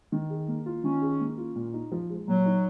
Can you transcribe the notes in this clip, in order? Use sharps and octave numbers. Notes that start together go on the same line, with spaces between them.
D#3
G#4
A#3
F4
D#3 C#4
G#4
A#3
F4
A#2
D#4
F3
G#3
A#2 F#3
D#4